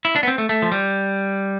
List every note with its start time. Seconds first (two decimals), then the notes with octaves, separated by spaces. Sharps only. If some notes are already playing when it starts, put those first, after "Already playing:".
0.05 E4
0.16 D4
0.23 B3
0.28 C4
0.38 A3
0.49 A3
0.62 F3
0.72 G3